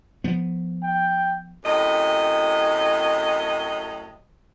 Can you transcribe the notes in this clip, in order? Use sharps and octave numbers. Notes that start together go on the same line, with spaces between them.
F3 B3
G5
F#2 A2 C3 D#5